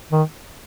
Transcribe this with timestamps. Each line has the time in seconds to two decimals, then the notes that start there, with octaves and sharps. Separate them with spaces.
0.12 D#3